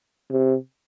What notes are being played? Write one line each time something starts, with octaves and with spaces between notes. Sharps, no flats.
C3